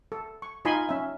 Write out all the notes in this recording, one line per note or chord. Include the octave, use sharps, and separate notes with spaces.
A4
C#6
D#4 F4 D#5 G#5 B5 C6
C#4 E5